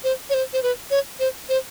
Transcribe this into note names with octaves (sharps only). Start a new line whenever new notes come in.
C5
C#5
C5
C5
B4
C#5
C5
C5